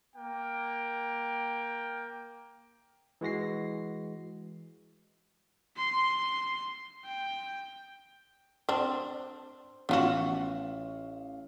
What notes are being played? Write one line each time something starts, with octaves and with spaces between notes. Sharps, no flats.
A#3 G5
E3 G#3 F#4 A#6 C7
C6
G5
C4 D4 C5
A1 B3 F4 F#4 F5 E7